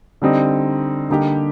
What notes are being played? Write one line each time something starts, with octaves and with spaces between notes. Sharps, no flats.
D3 G3 C4 D#4
D3 G3 A#3 D#4 G4